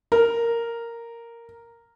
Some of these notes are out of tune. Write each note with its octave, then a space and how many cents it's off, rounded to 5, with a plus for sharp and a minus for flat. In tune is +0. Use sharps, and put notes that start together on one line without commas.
A#4 -5